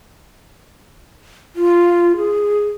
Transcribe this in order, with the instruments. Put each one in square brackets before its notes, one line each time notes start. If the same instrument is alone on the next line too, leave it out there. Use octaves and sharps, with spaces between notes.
[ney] F4
G#4